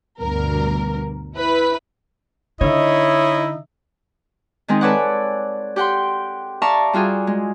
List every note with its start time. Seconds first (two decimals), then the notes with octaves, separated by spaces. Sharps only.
0.20 D2 G2 B2 D3 A#4
1.36 E4 B4 B5
2.61 D3 D#4 E4 C#5 D#5 E5
4.68 D#3 G#3 C4 D#4
4.81 A4 B4 C#5 D5 F#5
5.76 G4 F#5 G5 C6
6.62 D5 E5 F5 A5 A#5 C#6
6.93 G3 F4 F#4 G#4
7.27 G#3